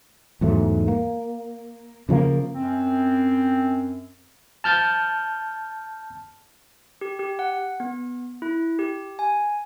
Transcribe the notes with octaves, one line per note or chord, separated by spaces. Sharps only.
E2 G#2 F#3 A3
A#3
C#3 F3 G#3 A#3
F#2 C4
A5 F6 G6 A6
G4
G4
F#5
B3
E4
G4
G#5